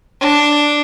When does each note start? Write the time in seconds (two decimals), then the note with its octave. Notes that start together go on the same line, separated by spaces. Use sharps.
0.21 D4